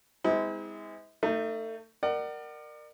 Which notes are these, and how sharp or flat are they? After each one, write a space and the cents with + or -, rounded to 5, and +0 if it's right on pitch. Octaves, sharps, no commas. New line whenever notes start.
G#3 -20 C4 -40 E4 -45
A3 +30 D#4 +0
A#4 +0 D5 +35 F#5 +25